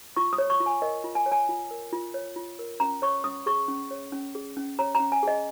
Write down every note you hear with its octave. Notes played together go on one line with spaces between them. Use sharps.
F4 C#6
D#6
C#5
C#6
F4
G#5
A#4 D#5
F4
G#5
C#5
G#5
F4
A#4
F4
C#5
F4
A#4
C#4 A#5
C#5 C#6
C#4 D#6
G#4 C#6
C#4
C#5
C#4
G#4
C#4
C#5 A#5
A#5
C#4
G#5
G#4 D#5